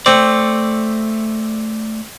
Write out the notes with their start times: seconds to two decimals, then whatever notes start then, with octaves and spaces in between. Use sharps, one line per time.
0.06 A3 C4 D5